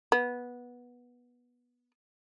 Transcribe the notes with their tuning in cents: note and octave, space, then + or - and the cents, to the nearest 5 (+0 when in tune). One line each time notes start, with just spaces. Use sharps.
B3 -15